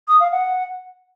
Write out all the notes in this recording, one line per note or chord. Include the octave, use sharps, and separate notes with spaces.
D#6
F5
F#5